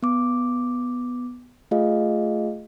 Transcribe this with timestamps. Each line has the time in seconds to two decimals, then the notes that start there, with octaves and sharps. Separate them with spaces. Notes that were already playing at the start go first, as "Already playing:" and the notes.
0.03 B3 D6
1.71 A3 F4 G#4 D#5 F5